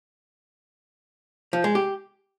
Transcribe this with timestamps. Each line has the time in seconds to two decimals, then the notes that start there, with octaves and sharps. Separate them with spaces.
1.53 F3
1.64 G#3
1.75 G4